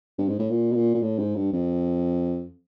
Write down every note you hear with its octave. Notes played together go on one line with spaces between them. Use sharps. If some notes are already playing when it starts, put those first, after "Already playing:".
G2
G#2
A2
A#2
B2
A#2
A#2
A2
G#2
G2
F2